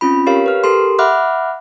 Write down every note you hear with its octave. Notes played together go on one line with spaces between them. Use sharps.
C4 C#4 F4 B5
G4 A#4 C#5 F5
B4 F6
G4 A4 A#4 C6
E5 F#5 B5 D6 F6 F#6